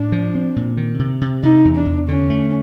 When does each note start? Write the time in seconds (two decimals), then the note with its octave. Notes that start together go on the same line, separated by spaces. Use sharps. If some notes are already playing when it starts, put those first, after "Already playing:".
Already playing: A2 D4
0.12 F3
0.35 C4
0.56 A#2
0.77 D#3
0.99 C3
1.21 C3
1.43 C3 D#4
1.65 E2
1.76 D4
1.86 E2
2.08 D3 C#4
2.30 A3